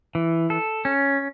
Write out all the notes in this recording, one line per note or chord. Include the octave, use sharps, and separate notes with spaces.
E3
A4
C#4